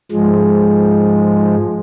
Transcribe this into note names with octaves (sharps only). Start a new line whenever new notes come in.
G#2 F3 G#3